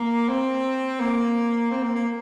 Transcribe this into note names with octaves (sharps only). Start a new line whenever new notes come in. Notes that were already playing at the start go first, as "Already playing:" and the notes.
Already playing: A#3
C4
A#3
C4
A#3
A#3